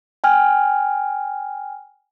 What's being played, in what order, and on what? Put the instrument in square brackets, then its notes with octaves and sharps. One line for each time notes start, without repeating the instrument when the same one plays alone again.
[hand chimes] G5 G#5 F6